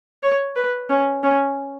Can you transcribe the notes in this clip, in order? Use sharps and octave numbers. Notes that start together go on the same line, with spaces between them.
C#5
B4
C#4
C#4